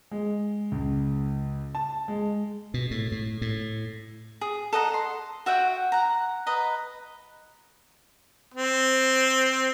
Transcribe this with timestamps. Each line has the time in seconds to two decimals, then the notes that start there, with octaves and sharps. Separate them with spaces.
0.11 G#3
0.72 C#2
1.75 A5
2.08 G#3
2.74 B2
2.91 A2
3.12 A2
3.41 A2
4.41 G#4
4.73 A4 D#5 F#5 A#5
4.94 C6
5.46 F#4 E5 F#5 G5
5.92 F#5 A#5
6.46 B4 D#5 A#5
8.54 C4